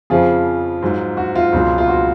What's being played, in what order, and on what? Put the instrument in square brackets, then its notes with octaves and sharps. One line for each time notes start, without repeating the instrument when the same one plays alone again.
[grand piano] F2 C#3 F3 F4 G#4
G#2 F#3
F#4
F4
C#2 B2 F#3
F4
F#4